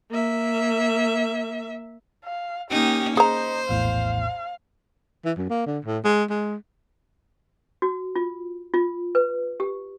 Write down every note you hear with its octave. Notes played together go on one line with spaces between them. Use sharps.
A#3 E5
F5
A#3 C#4 D#4 G4
D#4 G#4 C5 A#5
A#1 E2 A2 F5
E3
F#2
A#3
D3
A2
G#3
G#3
F#4
F4
F4
B4
G4